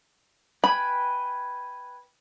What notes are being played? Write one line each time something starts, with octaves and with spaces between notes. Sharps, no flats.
B4 G5 G#5 B5